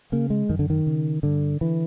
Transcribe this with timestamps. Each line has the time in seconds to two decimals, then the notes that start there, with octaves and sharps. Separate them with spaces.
0.12 C#3 A#3
0.30 G#3
0.49 F#2 D#3
0.59 D3
0.70 D#3
0.86 C#3
1.23 G2 D3
1.61 D3 E3